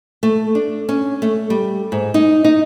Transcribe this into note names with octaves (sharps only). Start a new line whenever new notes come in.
A3
D4
C#4
A3
G3
G#2
D#4
D#4